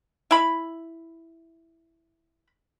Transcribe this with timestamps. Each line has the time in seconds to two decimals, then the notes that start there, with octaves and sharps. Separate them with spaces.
0.31 E4 B5